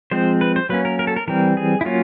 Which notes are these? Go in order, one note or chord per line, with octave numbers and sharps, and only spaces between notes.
F3 G#3 C4 C5
B4
C5
F#3 A#3 C#4 B4
A#4
A#4
A4
A#4
E3 G3 C4 A#4
G#4
E4
F#3 A#3 C#4 F4